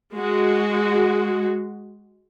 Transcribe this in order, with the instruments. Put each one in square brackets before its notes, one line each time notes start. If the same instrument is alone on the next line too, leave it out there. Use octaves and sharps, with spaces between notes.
[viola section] G#3 F#4